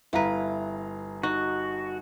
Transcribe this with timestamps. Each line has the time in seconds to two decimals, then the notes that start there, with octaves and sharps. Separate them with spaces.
0.13 G1 E4 B4 F5 A#5
1.23 D#4 F#4